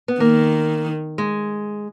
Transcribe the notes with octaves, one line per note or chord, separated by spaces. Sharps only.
B3
D#3 A#3
G#3